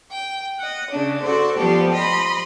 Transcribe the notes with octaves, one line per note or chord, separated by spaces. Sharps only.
G5
D#5 F#5
C#3 D4
F#4 A4 C5 D5
F3 G3 B3 G4 A4
D#5 B5 C6